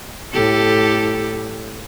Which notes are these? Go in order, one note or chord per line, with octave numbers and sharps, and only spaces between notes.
A2 G4 A4